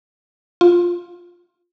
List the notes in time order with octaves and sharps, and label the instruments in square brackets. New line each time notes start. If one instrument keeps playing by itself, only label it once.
[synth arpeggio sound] F4